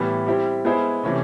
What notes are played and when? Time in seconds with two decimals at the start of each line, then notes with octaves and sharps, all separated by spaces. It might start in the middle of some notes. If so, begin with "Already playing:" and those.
Already playing: A2 E3 G3 B3
0.26 G3 C4 E4 G4
0.65 G#3 B3 E4 G#4 C5
1.04 C3 E3 A3 C#4